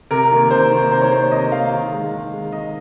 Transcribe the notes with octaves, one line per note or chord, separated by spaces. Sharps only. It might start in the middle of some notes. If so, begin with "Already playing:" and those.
C3 A#4
D#3 A#3
C3 C5
D#3 A#3
C3 C5
C#5
D#3 A#3 C5
C#5
C3 D#5
D#3 A#3 F5
D#3
G#3
D#3
G#3
D#3 D#5